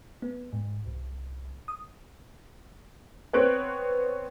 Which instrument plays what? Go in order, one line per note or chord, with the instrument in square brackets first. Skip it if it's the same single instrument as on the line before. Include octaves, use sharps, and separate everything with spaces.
[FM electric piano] B3
G#2
C2
D#6
[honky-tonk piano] B3 C4 C#5 F#6 D7